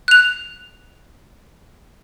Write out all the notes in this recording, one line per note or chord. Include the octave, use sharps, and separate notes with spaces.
F#6 F7